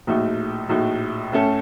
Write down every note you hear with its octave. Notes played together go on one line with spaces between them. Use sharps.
A#1 A2 A3 D#4 F#4
A#1 A2 A3 D#4 F#4
A2 A3 C#4 A4